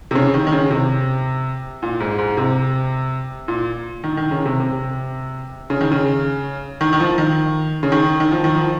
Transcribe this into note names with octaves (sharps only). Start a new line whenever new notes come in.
C3
C#3
D#3
D#3
C#3
C3
A#2
G#2
G#2
C3
A#2
D#3
D#3
C#3
C3
C3
C#3
D#3
C#3
D#3
D#3
F3
D#3
C#3
D#3
D#3
F3
D#3
F3